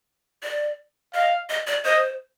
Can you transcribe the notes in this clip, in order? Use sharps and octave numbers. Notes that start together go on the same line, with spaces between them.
D5
D#5 F5
D#5
D5
C5 D#5